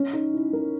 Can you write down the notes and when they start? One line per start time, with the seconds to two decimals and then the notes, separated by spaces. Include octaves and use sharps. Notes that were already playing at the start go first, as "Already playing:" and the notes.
Already playing: C#4
0.13 D#4
0.34 E4
0.53 A#4